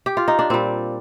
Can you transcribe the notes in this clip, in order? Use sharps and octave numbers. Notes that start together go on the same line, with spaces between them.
G4
F4
D#4
D4
A#2 G3 C4